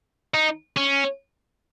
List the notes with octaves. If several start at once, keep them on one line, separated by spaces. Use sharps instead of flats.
D#4
C#4